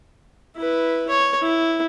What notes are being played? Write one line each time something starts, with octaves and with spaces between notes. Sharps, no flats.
E4 B4
C#5
E4